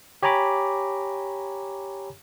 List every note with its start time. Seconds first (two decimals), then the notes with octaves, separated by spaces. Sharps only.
0.23 G4 C#5 G#5 A#5 B5 D6